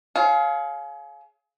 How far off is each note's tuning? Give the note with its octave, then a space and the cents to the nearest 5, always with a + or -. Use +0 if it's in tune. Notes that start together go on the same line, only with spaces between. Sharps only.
G#4 +35 C#5 +5 F5 +0